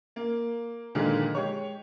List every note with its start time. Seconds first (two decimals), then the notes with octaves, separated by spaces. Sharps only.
0.16 A#3
0.95 A#2 D3 D#3 F3 G#3 A#3
1.35 G#3 G4 C#5